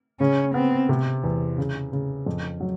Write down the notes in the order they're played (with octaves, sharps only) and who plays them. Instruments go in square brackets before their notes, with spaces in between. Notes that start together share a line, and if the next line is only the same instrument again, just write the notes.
[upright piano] C#3 [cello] C#4
[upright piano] B3 [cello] C4
[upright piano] C3
E2
C#3
C#3
F2
F#3